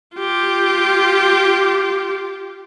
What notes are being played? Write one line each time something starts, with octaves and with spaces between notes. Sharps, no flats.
F4 G4